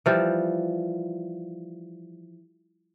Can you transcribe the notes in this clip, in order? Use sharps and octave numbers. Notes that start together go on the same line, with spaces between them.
E3 F3 G3